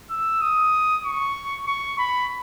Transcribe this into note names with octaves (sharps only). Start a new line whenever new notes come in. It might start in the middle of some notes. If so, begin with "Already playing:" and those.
E6
D#6
C#6
C#6
B5